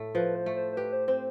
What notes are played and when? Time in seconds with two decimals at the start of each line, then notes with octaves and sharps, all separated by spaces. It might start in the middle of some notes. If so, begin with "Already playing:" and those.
Already playing: A2 A3
0.15 F3 B4
0.35 C5
0.46 A3
0.56 C5
0.72 C5
0.77 G4 B4
0.93 C5
1.07 C4 C5